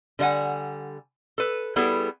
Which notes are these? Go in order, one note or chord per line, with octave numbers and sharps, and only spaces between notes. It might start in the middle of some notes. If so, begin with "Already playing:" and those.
D3 G3 D#5 F#5 G#5
A4 B4
G3 B3 E4 G#4 A4